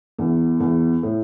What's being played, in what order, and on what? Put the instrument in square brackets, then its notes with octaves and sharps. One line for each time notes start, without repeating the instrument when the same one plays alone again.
[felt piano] E2
E2
A2